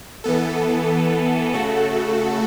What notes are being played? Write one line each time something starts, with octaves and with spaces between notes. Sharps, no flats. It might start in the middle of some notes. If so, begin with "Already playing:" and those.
E3 B3 A4
C#3 A3 F#4 A4